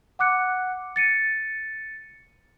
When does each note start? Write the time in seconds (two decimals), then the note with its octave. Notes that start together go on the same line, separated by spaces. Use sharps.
0.19 F#5 D6 F#6 C#7
0.96 A6 C#7 D#7